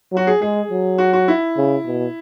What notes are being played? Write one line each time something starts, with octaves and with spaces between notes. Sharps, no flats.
F#3 F#4
G#4
G#3 G#4
F#3
F#4
F#4
E4
C#3
B2